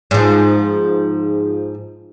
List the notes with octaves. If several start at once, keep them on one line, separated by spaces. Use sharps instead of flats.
G#2 F3